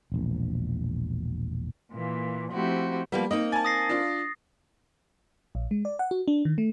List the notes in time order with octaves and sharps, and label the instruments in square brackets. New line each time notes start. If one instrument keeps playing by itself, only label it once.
[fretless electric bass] E1 A#1
[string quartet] A#2 E3 A#3
F3 A3 C4 E4 F#4 G4
[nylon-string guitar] F3 A#3 B3 [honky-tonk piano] G3
[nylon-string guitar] A#3 C4 D#4 [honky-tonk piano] D#5
[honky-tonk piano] G#5 A5 [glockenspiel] A6
[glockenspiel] D#6 A#6 C7
[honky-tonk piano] D4 F4
[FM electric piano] A#1
G#3
D5
F#5
F#4
D4
D#3
A3